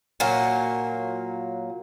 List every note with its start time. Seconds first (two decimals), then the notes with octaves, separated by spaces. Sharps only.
0.20 A#2 F#3 A#3